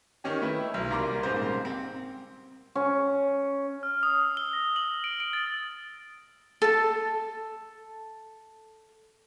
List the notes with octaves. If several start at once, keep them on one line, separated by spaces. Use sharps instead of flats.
D#3 C#4 G4
A3 E4 B4
B1
C2 A#3 A#5 C6 D6
D#1 G#2 C#3 A#3 C4 C5
C4
C#4
F6
D#6
E6
G7
A#6
F#7
D7
D7
A6
A4 A5